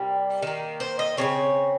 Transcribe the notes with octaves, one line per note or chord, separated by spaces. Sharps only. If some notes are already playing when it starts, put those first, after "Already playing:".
Already playing: C3 G3 A#3
D#3 A#3
C5
D#5
C#3 G3 C4 C#5